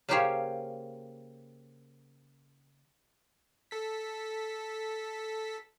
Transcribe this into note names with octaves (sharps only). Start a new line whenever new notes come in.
C#3 A#3 C#4 G4 C5 C#5
A4 B6